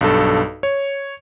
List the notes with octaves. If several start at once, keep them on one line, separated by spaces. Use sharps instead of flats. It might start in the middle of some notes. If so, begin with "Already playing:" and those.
B1 G2 A4
C#5